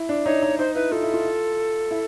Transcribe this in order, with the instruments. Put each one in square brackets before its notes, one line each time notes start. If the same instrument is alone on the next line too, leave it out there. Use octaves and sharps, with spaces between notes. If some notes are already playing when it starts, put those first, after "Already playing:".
Already playing: [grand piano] E4
D4
[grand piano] D#4 [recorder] C#5
[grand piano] D#4
[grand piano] D#4 [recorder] C5
[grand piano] E4 [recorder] B4
[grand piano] F4 [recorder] A4
[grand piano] E4
F4
E4